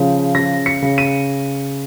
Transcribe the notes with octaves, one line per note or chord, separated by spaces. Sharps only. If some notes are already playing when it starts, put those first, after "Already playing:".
Already playing: C#3 F3
C#3 A#6
C#7
C#3
D#7